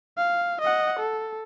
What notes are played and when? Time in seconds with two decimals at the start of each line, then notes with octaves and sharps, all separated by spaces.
0.17 F5
0.61 D#5 F#5
0.99 A4